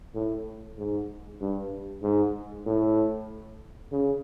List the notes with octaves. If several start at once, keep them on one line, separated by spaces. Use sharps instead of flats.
A2
G#2
G2
G#2
A2
C#3